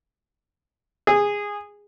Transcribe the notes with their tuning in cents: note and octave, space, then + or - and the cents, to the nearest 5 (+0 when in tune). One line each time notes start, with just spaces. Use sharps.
G#4 -15